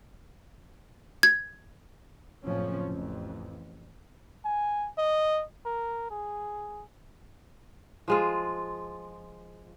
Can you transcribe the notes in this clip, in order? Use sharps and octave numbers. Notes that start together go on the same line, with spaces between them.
G#6
F#1 F2 A2 F3 C#4
A1 F2
G#5
D#5
A#4
G#4
F3 G#3 F4